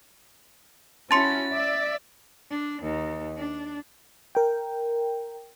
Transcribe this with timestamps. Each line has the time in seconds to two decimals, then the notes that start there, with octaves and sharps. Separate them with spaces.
1.11 C#4 E4 F#4 A5 C6 A6 C#7
1.51 D5 E5
2.51 D4
2.82 D#2
3.37 D4
4.35 A#4 G5